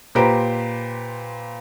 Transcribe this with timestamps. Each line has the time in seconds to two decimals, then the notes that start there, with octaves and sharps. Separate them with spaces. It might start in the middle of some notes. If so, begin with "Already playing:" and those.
0.15 A#2 G4 B4 C5 A#5 D7